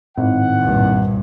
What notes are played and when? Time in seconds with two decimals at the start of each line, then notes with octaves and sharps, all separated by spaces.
0.18 G#1 A2 D#3 F#5
0.61 C2 G2 A#2